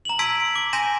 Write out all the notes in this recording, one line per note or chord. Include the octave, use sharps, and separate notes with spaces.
A#5 F#7
A5 C6 E6 G#6 B6 D7
D6
G#5 C6 G6 A#6 D#7 E7